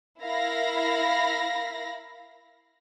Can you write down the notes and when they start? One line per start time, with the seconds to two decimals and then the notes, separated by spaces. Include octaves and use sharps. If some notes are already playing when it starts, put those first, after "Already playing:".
0.21 E4 A#4 F5 B5 A#6